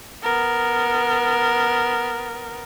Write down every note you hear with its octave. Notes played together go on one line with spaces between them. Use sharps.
B3 A#4